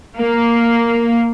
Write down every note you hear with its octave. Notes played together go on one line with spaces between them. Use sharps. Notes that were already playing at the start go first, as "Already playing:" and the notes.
A#3